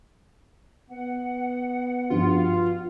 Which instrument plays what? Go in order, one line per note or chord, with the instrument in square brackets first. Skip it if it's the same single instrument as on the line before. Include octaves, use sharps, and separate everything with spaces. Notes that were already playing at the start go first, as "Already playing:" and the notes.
[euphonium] B3 [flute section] F#5
[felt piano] G2 F3 F#4 [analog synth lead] F4